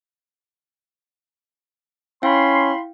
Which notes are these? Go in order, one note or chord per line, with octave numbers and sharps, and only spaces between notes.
C#4 E4 F5 G5 B5 C6